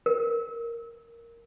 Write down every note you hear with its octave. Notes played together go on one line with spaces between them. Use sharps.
A#4